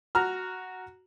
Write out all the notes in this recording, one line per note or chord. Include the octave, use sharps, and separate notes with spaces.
F#4 A#5 F6